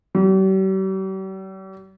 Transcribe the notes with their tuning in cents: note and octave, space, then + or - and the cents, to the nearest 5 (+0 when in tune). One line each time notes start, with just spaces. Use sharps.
G3 -45